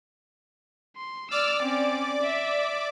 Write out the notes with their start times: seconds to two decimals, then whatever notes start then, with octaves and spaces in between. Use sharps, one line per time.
0.97 C6
1.31 D5 D6 E6 F6
1.62 C4 C#4
2.22 E5